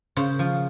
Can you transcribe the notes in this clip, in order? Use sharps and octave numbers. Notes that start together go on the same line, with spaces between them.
C#3 C5
F3